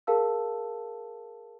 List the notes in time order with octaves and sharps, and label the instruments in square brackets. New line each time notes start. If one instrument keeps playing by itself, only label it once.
[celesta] G#4 A#4 F5 A5 E6